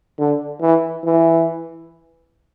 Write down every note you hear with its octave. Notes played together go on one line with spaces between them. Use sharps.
D3
E3
E3